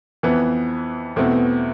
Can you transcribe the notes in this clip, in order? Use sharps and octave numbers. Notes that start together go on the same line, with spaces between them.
F2 E3 B3
E2 B2 A3 C4 E4